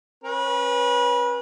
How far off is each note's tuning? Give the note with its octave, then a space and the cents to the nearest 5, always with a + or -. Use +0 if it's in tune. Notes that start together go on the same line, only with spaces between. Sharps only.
C#4 -30 B4 -30